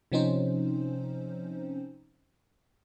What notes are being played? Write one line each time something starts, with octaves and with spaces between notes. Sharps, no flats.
C3 F3 C4 C#4 D#4 C5